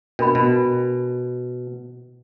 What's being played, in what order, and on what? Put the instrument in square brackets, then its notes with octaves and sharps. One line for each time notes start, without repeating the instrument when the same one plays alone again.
[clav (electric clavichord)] B2 [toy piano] D4 A#4 B5
[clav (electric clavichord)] B2